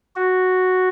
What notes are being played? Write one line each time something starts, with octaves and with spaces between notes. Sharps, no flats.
F#4